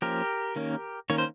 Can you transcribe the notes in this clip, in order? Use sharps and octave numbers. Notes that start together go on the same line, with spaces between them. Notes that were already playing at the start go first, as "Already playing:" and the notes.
F3 A#3 C#4 G4 A#4
D#3 A#3 C#4
D#3 A#3 C#4 C#5
C5